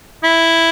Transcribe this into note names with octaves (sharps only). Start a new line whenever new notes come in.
E4